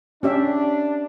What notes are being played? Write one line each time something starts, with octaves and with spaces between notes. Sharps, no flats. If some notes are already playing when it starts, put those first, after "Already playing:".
C#4 D4 G4 E5